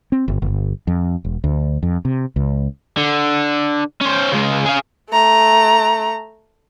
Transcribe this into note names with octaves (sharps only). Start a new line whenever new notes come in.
C4
G1
G1
F2
E1
D2
F2
C3
C#2
D3
C#4 C5
C#3 G#3
G#4 F5
A3 A#5